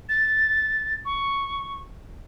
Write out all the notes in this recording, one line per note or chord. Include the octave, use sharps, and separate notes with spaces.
A6
C#6